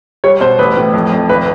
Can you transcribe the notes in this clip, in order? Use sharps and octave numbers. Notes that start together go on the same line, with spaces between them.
G3 C#5
B2 C5
A1 B4
A2
F2
F2
G#1 B4